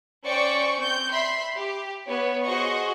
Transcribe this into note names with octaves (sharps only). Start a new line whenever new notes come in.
C#4 C5 D5 G5 C#6 C#7
C4 G6
E5 B5 C6
G4
B3 C#5
F#4 G#4 C5 D#5 C#6